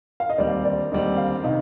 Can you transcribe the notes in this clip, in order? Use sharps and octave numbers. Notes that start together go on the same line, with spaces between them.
F5
D#5
D#2 D3 G3 C4 D5
D5
D#2 D3 G3 C4 D#5
F5
C3 D#3 D#5